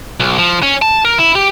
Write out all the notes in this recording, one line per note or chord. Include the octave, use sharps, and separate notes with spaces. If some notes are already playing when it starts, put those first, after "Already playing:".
B1
F3
C#4
A5
A#4
E4
G4